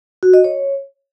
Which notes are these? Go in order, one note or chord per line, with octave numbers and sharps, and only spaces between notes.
F#4
D#5
C#5